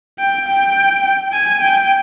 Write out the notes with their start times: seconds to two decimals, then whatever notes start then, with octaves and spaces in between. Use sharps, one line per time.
0.19 G5
0.48 G5
1.33 G#5
1.61 G5